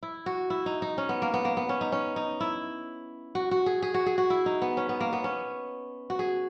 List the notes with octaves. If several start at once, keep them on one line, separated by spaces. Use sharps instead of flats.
E4
F#4
E4
D#4
D#4
C#4
B3
A#3
B3
A#3
B3
C#4
D#4
C#4
D#4
E4
F#4
F#4
G#4
G#4
F#4
G#4
F#4
E4
D#4
B3
C#4
B3
A#3
B3
C#4
F#4
G#4